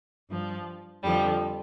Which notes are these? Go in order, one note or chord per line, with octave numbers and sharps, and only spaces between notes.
G2 F3
F2 D3 F3 G3